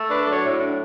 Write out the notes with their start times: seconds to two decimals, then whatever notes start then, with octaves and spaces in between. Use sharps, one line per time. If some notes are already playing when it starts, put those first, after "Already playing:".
Already playing: A3
0.10 D4 B4
0.21 A4
0.27 F#3 C#5 D5
0.44 A2
0.60 D4